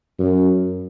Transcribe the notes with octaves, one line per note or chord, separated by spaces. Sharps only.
F#2